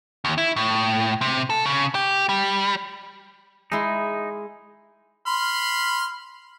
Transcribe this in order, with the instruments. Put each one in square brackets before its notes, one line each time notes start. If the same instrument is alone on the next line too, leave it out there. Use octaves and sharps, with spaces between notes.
[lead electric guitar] D#2
E4
A2
C3
A4
C#3
G4
G3
[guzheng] G#3 E4 C6 [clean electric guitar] D#4
[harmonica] B5 C6 F6